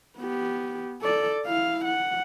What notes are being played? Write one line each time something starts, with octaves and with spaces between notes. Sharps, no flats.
B3 G4
A4 D5
E4 F5
F#5